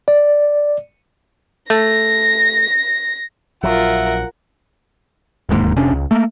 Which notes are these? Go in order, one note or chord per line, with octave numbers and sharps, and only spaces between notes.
D5
A3 A#6
A#1 F#3 F4 A#4 E5 F#5
D1 D#2 G#2 A#3
F1 C3 C#4 D4
C#2
A3 A#3